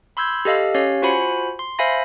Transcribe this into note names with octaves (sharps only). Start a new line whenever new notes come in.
B5 C6 E6 G6 G#6
G4 A4 D#5 F5
C#4 G4 C#5 F5
F4 F#4 C5 F#5 G#5 B5
C6
C5 E5 F5 G#5 B5 A#6